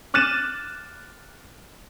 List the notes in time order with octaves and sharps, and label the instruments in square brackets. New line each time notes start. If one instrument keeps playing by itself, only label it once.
[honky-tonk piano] D6 F6 F#6 A6 D#7 E7